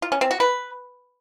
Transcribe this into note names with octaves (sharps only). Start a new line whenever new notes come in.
F4
C#4
C4
F#4
B4